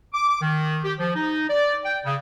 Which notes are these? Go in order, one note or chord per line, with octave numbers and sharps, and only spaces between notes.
D6
D6
D#3
G4
F3
D#4
D5
G5
C#3